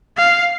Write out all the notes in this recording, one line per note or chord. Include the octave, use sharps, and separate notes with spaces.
F5